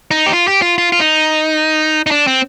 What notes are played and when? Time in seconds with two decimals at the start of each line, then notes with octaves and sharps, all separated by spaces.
0.11 D#4
0.26 G4
0.33 F4
0.48 G4
0.62 F4
0.78 F4
0.92 F4
1.00 D#4
2.07 D#4
2.11 D4
2.27 C4